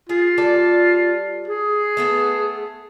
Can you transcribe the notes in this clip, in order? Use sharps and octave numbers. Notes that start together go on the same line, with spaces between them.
F4 G#4
G3 A4 D5
G#4
A3 B3 A4